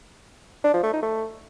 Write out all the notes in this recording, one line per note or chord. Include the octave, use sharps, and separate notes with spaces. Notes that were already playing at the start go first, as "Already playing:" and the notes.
D4
F3
A3
D#4
A3